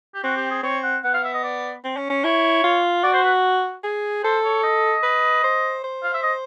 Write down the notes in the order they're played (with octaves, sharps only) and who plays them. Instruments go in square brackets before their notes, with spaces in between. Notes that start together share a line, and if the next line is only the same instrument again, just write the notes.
[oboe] G4
[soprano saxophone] C4 [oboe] F#4
[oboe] G4
G#4
[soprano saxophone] C4 [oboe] C#5
[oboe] F#5
[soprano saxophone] B3 [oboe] F#5
[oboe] F5
E5
D#5
D5
[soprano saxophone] C4
C#4
C#4
[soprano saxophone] E4 [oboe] C#5
[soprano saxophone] F4
[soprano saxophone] F#4 [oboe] D5
[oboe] C5
B4
[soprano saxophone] G#4
[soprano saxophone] A4 [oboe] C5
[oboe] C#5
D#5
[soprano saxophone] B4
C5
C5
[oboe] F5
E5
D#5